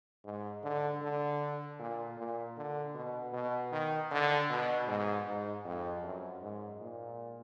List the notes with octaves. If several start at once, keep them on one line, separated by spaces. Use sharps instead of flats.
G#2
D3
D3
A#2
A#2
D3
B2
B2
D#3
D3
B2
G#2
G#2
F2
F#2
G#2
A#2